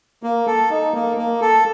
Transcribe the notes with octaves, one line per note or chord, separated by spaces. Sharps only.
A#3
A4
D#4
A#3
A#3
A4